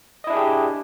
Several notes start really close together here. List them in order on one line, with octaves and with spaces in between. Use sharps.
D#5 E4 D4 G#4 G4